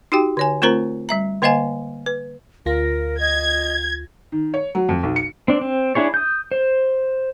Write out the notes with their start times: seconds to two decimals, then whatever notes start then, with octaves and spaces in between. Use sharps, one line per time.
0.12 D#4 F#4 G4 G5
0.37 D3 C#5 G#5
0.62 A3 C4 F4 A#4 C5 A#5
1.09 G3 E5 A#5
1.42 D3 A#3 C5 D#5 F5 G#5
2.06 B4
2.66 D2 F4 A#4 A#6
3.20 D#5 G#6
4.32 D#3
4.54 C#5
4.75 F#3
4.89 F2
5.03 B1
5.16 C#7
5.48 C4 D4
5.61 C4
5.95 D4 E4 G#4 C#5
6.14 D#6 G6
6.52 C5